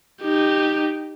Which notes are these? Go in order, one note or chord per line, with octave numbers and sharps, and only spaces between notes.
D#4 G4